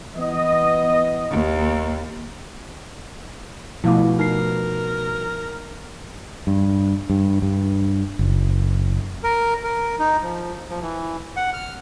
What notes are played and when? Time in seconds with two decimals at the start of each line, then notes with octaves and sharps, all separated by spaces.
0.16 E3 B3 D#5
1.30 D#2
3.84 B2 F3 A3 E4 F5 D6
4.19 D#4 A#4 C7
6.47 G2
7.10 G2
7.42 G2
8.19 F#1
9.24 A#4
9.64 A#4
9.99 D#4
10.22 F3
10.69 F3
10.82 E3
11.37 F#5
11.53 F6